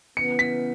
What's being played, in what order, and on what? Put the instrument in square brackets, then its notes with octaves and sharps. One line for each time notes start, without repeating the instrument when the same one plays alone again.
[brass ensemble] C#3 E3 B3 [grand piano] C#7
[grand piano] B6